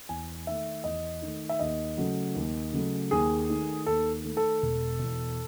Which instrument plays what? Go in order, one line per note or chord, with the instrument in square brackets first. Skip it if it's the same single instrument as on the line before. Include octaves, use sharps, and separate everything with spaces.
[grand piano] E2 G#5
D#3 A3 E5
E2 D#5
D#3 A3
E5
D#2 D#5
C#3 F#3 A3
D#2
C#3 F#3 A3
D#2 G#4
D#3 A3
D#2 A4
D#3 A3
A4
E1
E2 B2